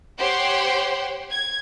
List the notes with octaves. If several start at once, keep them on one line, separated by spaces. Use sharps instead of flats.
G4 C5 C#5 F#5 G5 C6
G#6